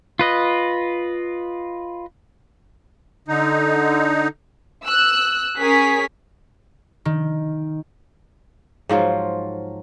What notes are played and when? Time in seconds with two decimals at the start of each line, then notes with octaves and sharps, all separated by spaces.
0.19 F4 B4 D#5
3.28 D3 D#4
4.84 E6 F#6
5.58 C#4 G#4 A#4 B6
7.05 D#3
8.89 G#2 F3 F#3 F4